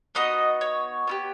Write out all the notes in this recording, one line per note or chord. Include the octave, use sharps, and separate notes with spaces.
B3 D#4 F#4 D#5
C#5
B3 E4 G4